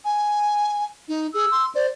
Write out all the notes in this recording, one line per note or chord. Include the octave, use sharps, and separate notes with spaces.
G#5
D#4
G#4 E6
C6
C5 D5